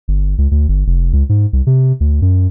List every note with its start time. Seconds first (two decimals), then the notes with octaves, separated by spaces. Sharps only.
0.08 G1
0.38 C#2
0.51 D2
0.68 G1
0.87 F1
1.13 C#2
1.29 G#2
1.53 C2
1.67 C3
2.00 D2
2.22 F#2